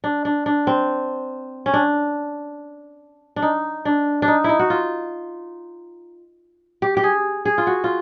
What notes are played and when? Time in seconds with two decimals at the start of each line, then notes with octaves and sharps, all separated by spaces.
0.04 D4
0.25 D4
0.46 D4
0.67 C4
1.66 C#4
1.74 D4
3.36 D4
3.42 D#4
3.85 D4
4.22 D4
4.28 D#4
4.44 D#4 E4
4.59 F#4
4.70 F4
6.82 G4
6.97 G4
7.03 G#4
7.45 G#4
7.58 F4
7.67 F#4
7.84 F4